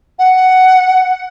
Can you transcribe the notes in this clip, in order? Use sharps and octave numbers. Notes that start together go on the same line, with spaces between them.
F#5